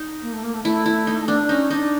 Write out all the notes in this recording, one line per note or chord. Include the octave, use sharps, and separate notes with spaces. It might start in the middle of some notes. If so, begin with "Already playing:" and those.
Already playing: D#4
A#3
A3
A#3
A3
A3 E4
E4
D#4
D4
C#4 D#4
D4 D#4